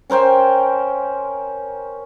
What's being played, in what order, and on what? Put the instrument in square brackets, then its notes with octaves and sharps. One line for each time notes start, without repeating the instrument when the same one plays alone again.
[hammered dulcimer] C#4 A#4 C5 G5